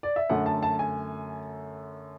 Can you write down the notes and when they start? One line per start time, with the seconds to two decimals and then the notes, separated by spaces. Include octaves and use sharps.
0.03 D5
0.16 E5
0.29 F#2 D3 A3 F#5
0.46 A5
0.63 A5
0.79 G#5